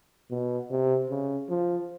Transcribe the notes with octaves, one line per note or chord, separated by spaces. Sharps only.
B2
C3
C#3
F3